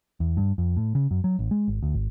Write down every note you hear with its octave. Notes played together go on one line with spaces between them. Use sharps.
E2
G2
F2
A2
C#3
F#2
F#3
A1
G#3
G#1
D2
G#1